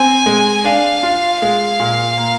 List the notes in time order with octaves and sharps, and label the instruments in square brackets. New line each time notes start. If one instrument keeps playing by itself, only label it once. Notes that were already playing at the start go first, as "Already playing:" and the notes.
Already playing: [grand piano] C4 [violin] G#5
[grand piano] G#3
[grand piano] D4 [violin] F5
[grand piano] F4
[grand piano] G#3 [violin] F5
[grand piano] A#2
A#3